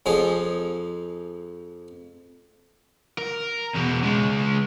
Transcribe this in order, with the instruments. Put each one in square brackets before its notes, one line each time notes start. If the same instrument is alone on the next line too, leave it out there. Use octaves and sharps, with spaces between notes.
[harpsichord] F2 F3 G#4
[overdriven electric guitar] A#4
E2 B2
C#3 G#3